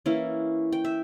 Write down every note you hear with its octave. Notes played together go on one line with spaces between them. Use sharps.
E3 A#3 C#4 E4
G5
E5